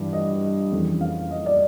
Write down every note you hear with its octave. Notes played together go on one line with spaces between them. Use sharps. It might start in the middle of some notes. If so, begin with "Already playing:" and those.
Already playing: G2 E3
D#5
F2 C#3 E3
F5
D#5
D5